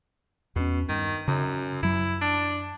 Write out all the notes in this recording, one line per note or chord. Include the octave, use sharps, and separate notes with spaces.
E2 B2 C#4
G2 D#3
F#2 C#3
F#2 F#3 E4
D4